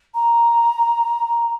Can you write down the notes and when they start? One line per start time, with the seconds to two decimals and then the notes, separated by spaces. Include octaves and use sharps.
0.14 A#5